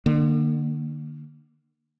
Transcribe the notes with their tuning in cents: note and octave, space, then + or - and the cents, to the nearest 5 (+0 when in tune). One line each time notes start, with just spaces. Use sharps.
D3 +35 A#3 +0